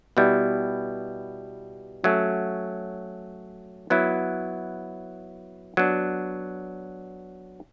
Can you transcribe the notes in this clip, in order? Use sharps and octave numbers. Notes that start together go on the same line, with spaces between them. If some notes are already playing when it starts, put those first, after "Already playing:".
B2 G3 B3 E4
F#3 A3 C#4
F#3 B3 E4
F#3 B3 D4